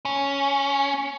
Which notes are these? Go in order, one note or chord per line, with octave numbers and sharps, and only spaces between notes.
C#4